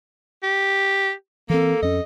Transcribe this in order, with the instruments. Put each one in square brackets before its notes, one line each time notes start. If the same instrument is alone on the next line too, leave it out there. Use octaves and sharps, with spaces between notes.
[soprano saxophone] G4
[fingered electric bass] E3 C4 [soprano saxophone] A#3 [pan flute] A4
[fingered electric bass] F2 C#4 [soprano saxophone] D#5